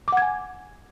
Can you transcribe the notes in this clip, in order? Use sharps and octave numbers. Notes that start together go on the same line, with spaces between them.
F#5 G#5 D6 G#6